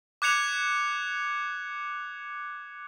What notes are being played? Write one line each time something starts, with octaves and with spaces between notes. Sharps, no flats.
D6 F#6 G#6 C#7 F7